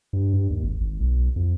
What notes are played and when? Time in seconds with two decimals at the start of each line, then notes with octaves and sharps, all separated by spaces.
0.13 G2
0.34 G2
0.50 D#2
0.63 G#1
0.81 G#1
1.00 B1
1.36 F2